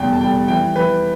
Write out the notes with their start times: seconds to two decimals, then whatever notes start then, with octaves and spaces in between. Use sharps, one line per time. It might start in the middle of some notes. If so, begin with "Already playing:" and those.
Already playing: F1 E2 G3 G5
0.13 A5
0.21 G3 G5
0.48 E3 G5
0.76 E3 B4